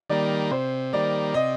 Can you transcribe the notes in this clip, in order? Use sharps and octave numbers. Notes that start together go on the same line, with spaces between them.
D#3 G3 A#3 D5
C3 C5
D#3 G3 A#3 D5
C3 D#5